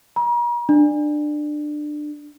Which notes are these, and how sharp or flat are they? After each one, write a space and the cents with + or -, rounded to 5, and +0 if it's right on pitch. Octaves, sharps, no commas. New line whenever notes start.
A#5 +45
D4 +20